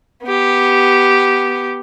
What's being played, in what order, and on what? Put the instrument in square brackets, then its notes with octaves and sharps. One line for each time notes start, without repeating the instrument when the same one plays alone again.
[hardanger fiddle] B3 G4